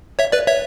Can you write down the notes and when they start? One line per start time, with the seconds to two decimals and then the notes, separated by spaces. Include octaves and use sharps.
0.19 C#5 E5
0.32 B4 D5
0.47 C#5 E5